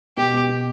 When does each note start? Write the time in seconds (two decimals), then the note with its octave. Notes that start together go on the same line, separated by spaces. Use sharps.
0.17 B2 G4
0.34 B3
0.49 B2